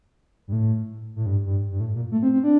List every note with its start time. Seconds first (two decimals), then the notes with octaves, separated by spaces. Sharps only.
0.48 G2
0.52 A2
1.16 A2
1.26 G2
1.46 G2
1.72 G2
1.80 A2
1.95 A#2
2.12 A3
2.23 C4
2.33 C4
2.44 D4